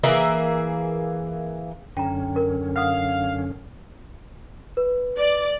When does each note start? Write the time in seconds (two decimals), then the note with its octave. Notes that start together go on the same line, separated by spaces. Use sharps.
0.04 E3 A#3 G#4 E5
1.97 F#2 D3 C#4 G5 A#5
2.36 A#4
2.76 F5 F#5 D#6
4.77 B4
5.18 D5